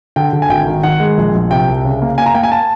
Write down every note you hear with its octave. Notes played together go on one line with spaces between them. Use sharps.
D3 G5
D3
G#5
G#1 G5
D#3
D#3 F#5
G#3
A#1
A#1
C3 G5
C2
C#3
A#3
A#3 G#5
A#5
A#3 G5
G#5
A5